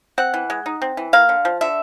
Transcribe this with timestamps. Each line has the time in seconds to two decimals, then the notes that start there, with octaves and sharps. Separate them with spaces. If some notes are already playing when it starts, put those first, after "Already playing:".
0.18 C4 F#5
0.34 E3
0.50 G#3
0.66 D#4
0.82 C4
0.97 E3
1.13 A#3 F5
1.29 D3
1.45 F3
1.61 D3 E5